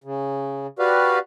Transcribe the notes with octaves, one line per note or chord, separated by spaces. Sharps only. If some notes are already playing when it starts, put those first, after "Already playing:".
C#3
F#4 G4 B4 D5 F5